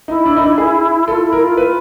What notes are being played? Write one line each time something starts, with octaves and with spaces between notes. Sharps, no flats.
D#4 E4
D4
D#4
D4
G#4
F4 A4
E4
A#4
F4
F4 B4